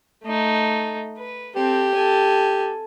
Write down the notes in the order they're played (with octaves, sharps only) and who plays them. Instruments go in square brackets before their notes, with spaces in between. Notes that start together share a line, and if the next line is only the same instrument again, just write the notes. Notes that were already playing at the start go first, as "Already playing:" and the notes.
[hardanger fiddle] A3 D#4
B4
[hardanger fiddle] C4 A4 [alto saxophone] G4
[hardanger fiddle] A4 G#5